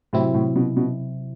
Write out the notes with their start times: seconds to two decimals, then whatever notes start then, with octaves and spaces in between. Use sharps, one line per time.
0.13 A2 C3 F#3 C4 E4
0.34 A2
0.56 B2
0.77 B2